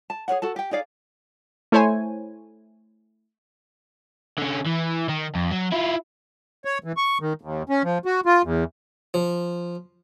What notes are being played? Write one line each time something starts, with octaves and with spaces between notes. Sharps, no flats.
A5
G#4 B4 C#5 F#5
F#4 A4 A5
G4 G5
D#4 G#4 D5 F5
A3 E4 C5 C#5 G#5
D3 C#4
E3
D#3
F2
F#3
E4 F4
C#5
E3
C#6
D#3
D#2
C#4
F3
F#4
F4
E2
F3